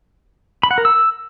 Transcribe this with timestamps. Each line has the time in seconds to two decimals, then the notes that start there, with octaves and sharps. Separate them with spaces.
0.63 B5
0.71 F#5
0.78 A#4
0.85 E6